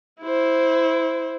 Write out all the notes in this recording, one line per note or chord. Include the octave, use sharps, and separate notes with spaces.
E4 C5